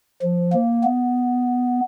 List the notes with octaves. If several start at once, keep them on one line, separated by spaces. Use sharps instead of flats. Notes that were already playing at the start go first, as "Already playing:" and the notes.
F3
A#3
B3